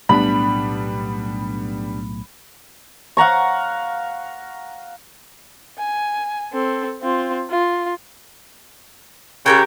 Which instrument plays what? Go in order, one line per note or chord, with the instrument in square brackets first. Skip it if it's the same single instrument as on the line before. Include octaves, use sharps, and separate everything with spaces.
[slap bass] B1 A2 A3 [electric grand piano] G3 B3 D4 [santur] B5
[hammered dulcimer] F5 F#5 A#5 C#6
[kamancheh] G#5
C4 A4
C4 F4
F4
[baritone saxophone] C#3 [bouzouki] G4 A#4 G5